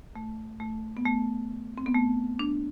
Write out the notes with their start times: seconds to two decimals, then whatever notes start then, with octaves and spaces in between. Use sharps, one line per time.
0.16 A3
0.60 A3
0.97 B3
1.05 A3
1.78 C4
1.86 B3
1.94 A3
2.39 D4